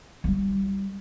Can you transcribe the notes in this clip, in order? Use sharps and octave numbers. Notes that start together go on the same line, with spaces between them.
G3 F4